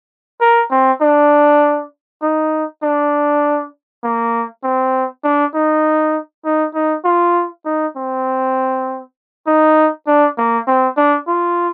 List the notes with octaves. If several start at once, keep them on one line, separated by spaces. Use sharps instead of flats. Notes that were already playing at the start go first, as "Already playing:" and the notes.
A#4
C4
D4
D#4
D4
A#3
C4
D4
D#4
D#4
D#4
F4
D#4
C4
D#4
D4
A#3
C4
D4
F4